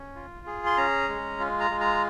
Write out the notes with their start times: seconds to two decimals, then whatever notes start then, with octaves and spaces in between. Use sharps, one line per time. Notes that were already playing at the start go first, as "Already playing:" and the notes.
Already playing: C#4
0.16 F4
0.46 G#4
0.66 C6
0.77 C#4 A#5
1.09 G#3
1.40 F4
1.60 A#5
1.71 G#3
1.81 A#5